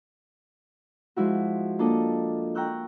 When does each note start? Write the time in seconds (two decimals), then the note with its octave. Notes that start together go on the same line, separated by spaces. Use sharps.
1.16 F3 G#3 E4 F#4
1.79 A#3 D4 F4 A4 D#5 A5
2.55 G5 A#5 C#6 E6 F#6 G6